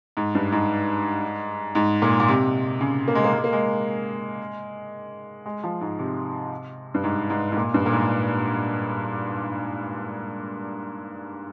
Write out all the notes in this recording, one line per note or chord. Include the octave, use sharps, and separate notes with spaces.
G#2
G2
G#2
G#2
A#2
A#2
C3
C#3
A#3
G#3
A#3
G#3
A#3
G#3
G#3
F3
G#2
C3
G2
G#2
G#2
G#2
A#2
G2
A#2
G#2